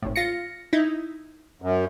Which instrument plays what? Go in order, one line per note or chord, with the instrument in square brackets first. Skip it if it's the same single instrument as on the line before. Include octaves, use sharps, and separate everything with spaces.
[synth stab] G#1 A2
F4 A#6 C#7
D#4 E4
[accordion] F#2